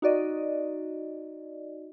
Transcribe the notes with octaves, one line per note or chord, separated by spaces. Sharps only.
D#4 F#4 D5 D#5